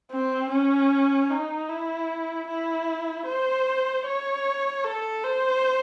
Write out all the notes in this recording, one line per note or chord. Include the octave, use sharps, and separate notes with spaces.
C4
C#4
D#4
E4
E4
C5
C#5
A4
C5